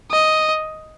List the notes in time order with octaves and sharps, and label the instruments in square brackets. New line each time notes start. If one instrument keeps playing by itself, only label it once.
[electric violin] D#5